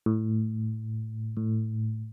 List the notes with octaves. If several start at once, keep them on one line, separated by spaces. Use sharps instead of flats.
A2
A2